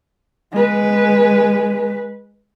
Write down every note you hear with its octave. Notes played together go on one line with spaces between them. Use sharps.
G#3 B4